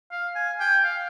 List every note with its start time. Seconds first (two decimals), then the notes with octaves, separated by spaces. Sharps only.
0.11 F5
0.36 G#5
0.60 G5
0.84 F5